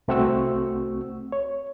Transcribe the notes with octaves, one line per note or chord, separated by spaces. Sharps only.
C2 A3 C4 F#4 C#6 E6
C#5